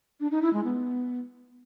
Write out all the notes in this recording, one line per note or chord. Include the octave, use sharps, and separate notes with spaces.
D4
D#4
E4
G#3
B3